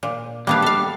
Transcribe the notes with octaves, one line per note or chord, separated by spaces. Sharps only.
A#2
G3 A#3 B3 D4 F5
A4 F5